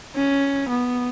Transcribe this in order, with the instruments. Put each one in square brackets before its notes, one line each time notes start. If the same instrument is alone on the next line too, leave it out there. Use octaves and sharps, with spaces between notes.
[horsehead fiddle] C#4
B3